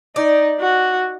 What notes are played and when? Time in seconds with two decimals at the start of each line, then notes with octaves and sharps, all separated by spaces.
0.16 D#4 D5
0.60 F#4